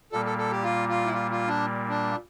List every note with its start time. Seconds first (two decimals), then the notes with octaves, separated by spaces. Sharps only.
0.12 A#2 G3 A#3 A4
0.25 A4
0.38 A4
0.51 G4
0.63 F4
0.89 F4
1.06 E4
1.14 F4
1.31 F4
1.48 D4
1.89 D4